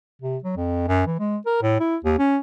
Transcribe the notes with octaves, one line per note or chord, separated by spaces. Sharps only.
C3
F#3
F2
F#2
E3
G#3
A#4
A2
E4
D#2
C#4